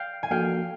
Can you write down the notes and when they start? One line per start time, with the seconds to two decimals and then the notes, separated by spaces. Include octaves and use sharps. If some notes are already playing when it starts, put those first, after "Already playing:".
Already playing: F5 G5
0.23 G#5
0.31 F3 A#3 D4 F#4 A4 F5 G5